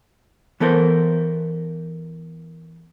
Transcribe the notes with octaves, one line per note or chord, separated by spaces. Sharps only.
E3 B3 A4 A#4 C5